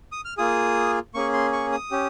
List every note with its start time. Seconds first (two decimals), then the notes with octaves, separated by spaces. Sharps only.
0.12 D#6
0.25 F6
0.38 A#3 F4 G#4 D#6
1.14 A#3 C#4 G#4 C#6
1.33 C6
1.53 C#6
1.72 D#6
1.91 C#4 G4